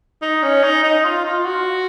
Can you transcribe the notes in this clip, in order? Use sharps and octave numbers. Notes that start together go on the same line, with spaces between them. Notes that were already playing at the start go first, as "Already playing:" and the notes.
D#4
C#4
D#4
D#4
F4
F4
F#4